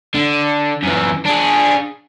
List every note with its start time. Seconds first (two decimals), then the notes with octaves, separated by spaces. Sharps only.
0.15 D3
0.83 F#2 E3
1.26 D4 G#4